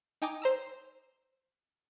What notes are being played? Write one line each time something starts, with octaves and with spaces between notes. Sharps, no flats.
D#4 G5 G#5 A#5 D6 D#6
C5 A#5 E6